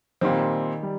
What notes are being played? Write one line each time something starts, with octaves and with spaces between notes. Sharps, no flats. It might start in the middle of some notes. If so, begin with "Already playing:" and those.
A#2 D#3 G3 C4
G3